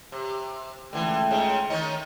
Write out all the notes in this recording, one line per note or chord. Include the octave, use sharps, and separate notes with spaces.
C3
C#2 D3 E3 A3 G5
G#2 C#3
D#3 C#4 D#4